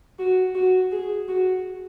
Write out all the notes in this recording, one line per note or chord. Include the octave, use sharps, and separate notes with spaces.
F#4
F#4
G#4
F#4